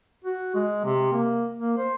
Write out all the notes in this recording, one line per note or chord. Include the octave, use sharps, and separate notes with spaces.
F#4
G#3
C3
A#3
A#3
C5